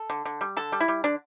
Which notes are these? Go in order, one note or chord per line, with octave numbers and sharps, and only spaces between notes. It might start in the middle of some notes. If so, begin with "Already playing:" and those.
Already playing: A4
D3
D3
G3
D3 A4
G3
E4
G3
D3 D4